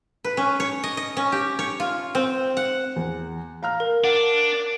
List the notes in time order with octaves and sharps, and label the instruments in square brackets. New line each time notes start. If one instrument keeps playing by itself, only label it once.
[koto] B4
C#4
C#5
D#5
D#5
C#4
G4
C#5
F4
C4
F#5
[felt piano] E2
F5 A#5 F6
[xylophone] A#4
[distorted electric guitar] D4 [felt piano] F#5